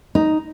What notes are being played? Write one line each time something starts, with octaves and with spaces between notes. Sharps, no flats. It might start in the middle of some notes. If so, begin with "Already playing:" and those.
D#4